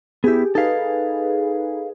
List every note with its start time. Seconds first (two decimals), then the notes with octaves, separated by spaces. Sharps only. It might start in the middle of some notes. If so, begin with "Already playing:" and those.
0.24 B3 E4 G4 G#4
0.55 D#4 G#4 A4 B4 F5